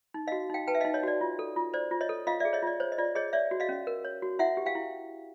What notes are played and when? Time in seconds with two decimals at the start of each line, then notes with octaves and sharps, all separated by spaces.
0.14 D#4
0.27 D#5 F5
0.32 F#4
0.50 D#4 F5 G5
0.67 B4 G5 A5
0.75 E5
0.81 D#4 D#5 F5
0.94 C#5 D#5
1.03 F#4 D5
1.21 F4
1.39 A4
1.56 F4
1.74 C5 D5
1.91 F4
2.01 C#5 D#5
2.09 A4
2.27 F4 D#5 F5
2.40 D5 E5
2.45 G#4
2.53 C#5 D#5
2.62 F4 D5
2.80 C5 C#5
2.92 D#5
2.98 F4 D5
3.15 G#4 C#5 D#5
3.33 C#5 D5 E5
3.51 F#4
3.60 D#5 F5
3.69 C#4
3.87 A#4
4.05 C#5
4.22 F#4
4.39 E4 E5 F#5
4.57 G4
4.66 F5 G5
4.75 E4